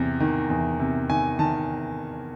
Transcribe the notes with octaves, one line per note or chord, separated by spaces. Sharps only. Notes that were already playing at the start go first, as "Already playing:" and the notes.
Already playing: E2 C3
D#3
E2
C3
D#3 G#5
D#3 A5